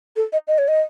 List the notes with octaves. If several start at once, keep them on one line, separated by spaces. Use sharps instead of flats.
A4
D#5
D#5
C#5
D#5